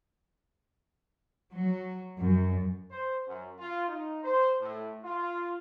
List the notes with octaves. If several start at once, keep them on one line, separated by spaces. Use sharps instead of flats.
F#3
F#2
C5
F#2
F4
D#4
C5
A2
F4